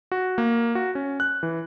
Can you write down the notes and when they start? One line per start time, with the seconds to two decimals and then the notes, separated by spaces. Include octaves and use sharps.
0.12 F#4
0.38 A#3
0.75 F#4
0.95 C#4
1.20 F#6
1.43 E3